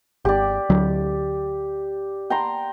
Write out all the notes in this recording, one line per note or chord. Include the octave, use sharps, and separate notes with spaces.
G#1 G4 D5
D2 F#3
G5 A#5 C6